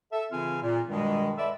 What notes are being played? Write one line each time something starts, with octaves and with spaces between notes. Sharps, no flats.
A4 E5
C#3 E3 C4 F4 F5 G#5
A#2
G2 B2 D#3 G3 G#3
A4 B4 D5 E5